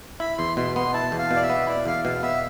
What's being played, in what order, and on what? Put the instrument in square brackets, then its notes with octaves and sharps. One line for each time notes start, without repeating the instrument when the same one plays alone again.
[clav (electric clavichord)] E4 [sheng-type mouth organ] B5
[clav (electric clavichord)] E2 [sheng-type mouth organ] C6
[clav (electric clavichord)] B2 [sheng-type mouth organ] C6
[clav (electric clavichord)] B3 [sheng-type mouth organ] C6
[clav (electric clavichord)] E4 [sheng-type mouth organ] A5
[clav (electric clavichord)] E2
[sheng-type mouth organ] F5
[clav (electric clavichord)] B2
[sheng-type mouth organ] D5
E5
[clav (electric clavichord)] B3
[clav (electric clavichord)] E4 [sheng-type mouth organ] D5
[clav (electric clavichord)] E2 [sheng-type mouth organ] F5
[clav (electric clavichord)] B2 [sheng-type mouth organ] F5
[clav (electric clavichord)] B3 [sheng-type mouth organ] E5